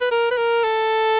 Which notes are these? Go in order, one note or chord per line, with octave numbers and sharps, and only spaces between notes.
B4
A#4
B4
A#4
A4